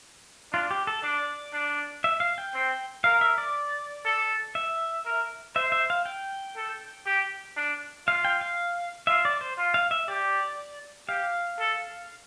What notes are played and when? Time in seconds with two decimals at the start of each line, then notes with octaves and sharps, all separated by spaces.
0.53 D4 F4
0.71 G4
0.87 A4
1.04 D4 D5
1.53 D4
2.04 E5
2.20 F5
2.38 G5
2.54 C4
3.04 A#4 F5
3.21 E5
3.38 D5
4.05 A4
4.55 E5
5.06 A#4
5.55 C5 E5
5.72 E5
5.90 F5
6.06 G5
6.56 A4
7.06 G4
7.57 D4
8.07 F4 F5
8.25 G5
8.41 F5
9.07 F4 E5
9.25 D5
9.41 C5
9.58 F4
9.74 F5
9.91 E5
10.08 G4 D5
11.09 G4 F5
11.59 A4